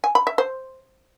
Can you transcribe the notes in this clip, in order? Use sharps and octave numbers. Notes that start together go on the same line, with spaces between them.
G#5
B5
E5
C5